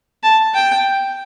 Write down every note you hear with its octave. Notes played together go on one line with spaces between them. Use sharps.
A5
G5